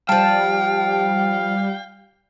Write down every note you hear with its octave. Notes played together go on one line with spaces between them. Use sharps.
F3 G3 F5 G5 A5